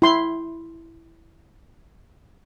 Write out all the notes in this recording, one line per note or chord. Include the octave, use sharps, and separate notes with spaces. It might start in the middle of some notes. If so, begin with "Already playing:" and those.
E4 C6